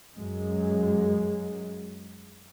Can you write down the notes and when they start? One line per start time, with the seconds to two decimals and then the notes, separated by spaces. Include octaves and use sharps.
0.16 F#2 G#3